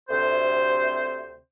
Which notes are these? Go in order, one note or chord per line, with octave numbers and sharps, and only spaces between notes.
D2 C3 C5